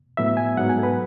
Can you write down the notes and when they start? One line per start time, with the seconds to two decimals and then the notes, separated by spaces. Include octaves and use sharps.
0.17 A2 F#3 B3 E5
0.37 G#5
0.57 G#2 F#3 B3 F#5
0.69 G#5
0.78 A4
0.83 B4